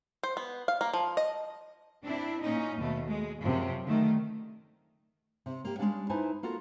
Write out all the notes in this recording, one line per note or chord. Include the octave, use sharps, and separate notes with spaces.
C5
B3
F5
A#3
F3
D#5
C4 D4 E4
A#2 C#4 D#4
D#2 B2 A3
G#3
F#2 C3 F3
D3 D#3 A3
C3
A#3 G4
G3 G#3 A#3 C#4 D4 F5
D#4 E4 B4 C5 G#5 A5
A#3 F4 F#4 A4 A#4